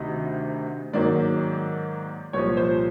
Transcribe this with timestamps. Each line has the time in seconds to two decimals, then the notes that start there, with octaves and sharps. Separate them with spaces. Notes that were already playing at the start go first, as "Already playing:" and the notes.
Already playing: D2 C3 D#3 D#5
0.93 G#2 D#3 F#3 A#3 D5
2.33 C2 A#2 F3 C#5
2.57 C5